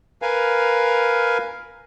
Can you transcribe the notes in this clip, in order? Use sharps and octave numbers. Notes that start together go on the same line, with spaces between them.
A#4 B4 F5 G#5